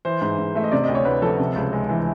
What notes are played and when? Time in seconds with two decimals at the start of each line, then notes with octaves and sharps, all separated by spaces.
0.05 E3 C5
0.21 G#2
0.38 G#2
0.55 A3 E5
0.64 D#5
0.72 C3 D5
0.84 D2 D#5
0.95 C#5
1.05 D2 B4
1.22 F3 A4
1.39 C3
1.56 C#2
1.73 G#3
1.89 E3